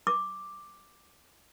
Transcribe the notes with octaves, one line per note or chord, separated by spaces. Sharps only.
D6